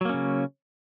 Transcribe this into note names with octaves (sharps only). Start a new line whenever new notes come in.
C#3 F#3 A#3 C#4